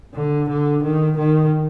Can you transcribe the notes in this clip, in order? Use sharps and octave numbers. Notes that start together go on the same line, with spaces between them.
D3
D3
D#3
D#3